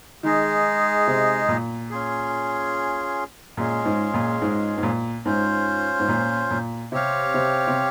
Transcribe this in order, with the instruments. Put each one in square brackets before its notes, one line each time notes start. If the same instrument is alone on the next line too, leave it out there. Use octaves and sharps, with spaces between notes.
[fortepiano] D#3 [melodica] G#3 D#4 G#4 D#5
[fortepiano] C3
A#2
[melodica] C#4 F4 G#4
[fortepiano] A#2 [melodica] G#3 C#4 F4 G#4
[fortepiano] G#2
A#2
G#2
G#2
A#2
[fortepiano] G#2 [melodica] C#4 F4 C5
[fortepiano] G#2
A#2
A#2
[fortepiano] C3 [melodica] C4 G4 C#5 F5
[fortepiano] C3
C3